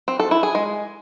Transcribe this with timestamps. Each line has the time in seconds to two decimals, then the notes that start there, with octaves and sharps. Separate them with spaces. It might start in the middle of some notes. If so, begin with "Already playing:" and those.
0.08 C4
0.20 A4
0.31 E4
0.43 G#4
0.55 G#3